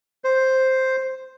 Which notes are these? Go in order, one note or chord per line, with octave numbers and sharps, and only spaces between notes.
C5